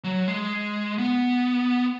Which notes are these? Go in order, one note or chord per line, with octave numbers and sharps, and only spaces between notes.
F#3
G#3
B3